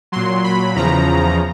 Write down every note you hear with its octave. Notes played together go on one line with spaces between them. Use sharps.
A#2 F#3 C6
B5
E2 C#3 F3 A#5